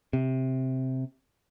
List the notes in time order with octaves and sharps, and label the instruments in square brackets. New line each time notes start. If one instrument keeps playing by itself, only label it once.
[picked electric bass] C3